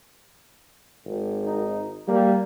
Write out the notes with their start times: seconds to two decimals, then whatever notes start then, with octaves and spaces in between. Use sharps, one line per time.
1.05 G#1
1.46 D#4
2.08 G3 A#3